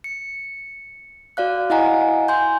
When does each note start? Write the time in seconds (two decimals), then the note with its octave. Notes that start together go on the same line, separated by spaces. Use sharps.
0.04 C#7
1.37 F#4 D5 F5 F#6
1.70 E4 D#5 F5 F#5 G#5 A#5
2.28 G#5 C6 G6